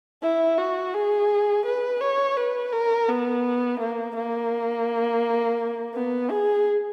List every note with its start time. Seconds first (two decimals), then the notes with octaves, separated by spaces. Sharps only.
0.22 E4
0.58 F#4
0.94 G#4
1.66 B4
2.01 C#5
2.37 B4
2.73 A#4
3.09 B3
3.80 A#3
4.16 A#3
5.94 B3
6.30 G#4